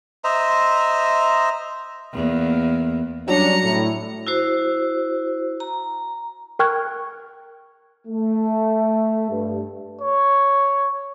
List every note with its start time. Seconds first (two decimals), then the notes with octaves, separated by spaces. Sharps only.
0.24 C5 D#5 E5 A#5
2.13 E2 A#3
3.28 F#3 G3 C#4 D4 A#5 C#7
3.63 A2
4.27 E4 F#4 C5
5.60 A#5
6.59 A#4 G5 C#6 F6 F#6 G#6
8.07 A3
9.30 G2
10.01 C#5